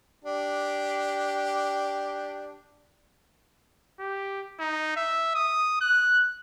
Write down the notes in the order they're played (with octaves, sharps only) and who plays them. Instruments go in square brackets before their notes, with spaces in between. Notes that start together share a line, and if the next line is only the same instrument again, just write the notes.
[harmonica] D4 G4
[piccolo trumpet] G4
D#4
E5
D#6
F#6